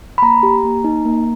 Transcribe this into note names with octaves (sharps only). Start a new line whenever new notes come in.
B5
A#3 A#5
G4
A#3
D#4
A#3